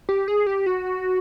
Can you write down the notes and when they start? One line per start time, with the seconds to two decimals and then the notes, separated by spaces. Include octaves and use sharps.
0.09 G4
0.28 G#4
0.46 G4
0.66 F#4